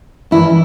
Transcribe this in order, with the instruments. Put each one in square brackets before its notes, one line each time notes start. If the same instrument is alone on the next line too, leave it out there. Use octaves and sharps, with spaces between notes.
[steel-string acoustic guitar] G2 E3 E4